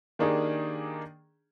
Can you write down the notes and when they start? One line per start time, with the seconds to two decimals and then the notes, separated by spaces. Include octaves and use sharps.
0.19 D#3 A#3 D4 D#4 G4 G#4